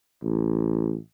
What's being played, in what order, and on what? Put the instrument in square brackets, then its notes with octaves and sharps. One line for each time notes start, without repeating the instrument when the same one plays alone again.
[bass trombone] A1